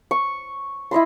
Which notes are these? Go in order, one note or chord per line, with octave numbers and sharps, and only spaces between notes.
C#6
E4 D#5 B5 C6